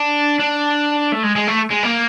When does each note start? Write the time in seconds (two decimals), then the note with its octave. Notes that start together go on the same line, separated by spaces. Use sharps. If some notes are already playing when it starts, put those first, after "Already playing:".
Already playing: D4
0.39 D4
1.12 A3
1.23 G#3
1.36 G#3
1.47 A3
1.71 G#3
1.83 A#3